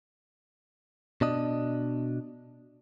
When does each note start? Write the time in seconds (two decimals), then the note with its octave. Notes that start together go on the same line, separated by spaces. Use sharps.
1.21 B2 D4 D#5